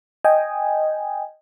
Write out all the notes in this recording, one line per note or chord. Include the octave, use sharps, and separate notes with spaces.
D#5 G5 G#5